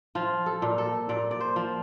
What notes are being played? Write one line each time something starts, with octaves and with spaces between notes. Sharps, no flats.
F3 F4
A4
A#2
A4
A#2 D5
D5
C5
F3